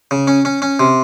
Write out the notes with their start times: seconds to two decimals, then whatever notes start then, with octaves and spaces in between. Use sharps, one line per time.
0.11 C#3
0.27 C#4
0.45 C#4
0.62 C#4
0.80 C3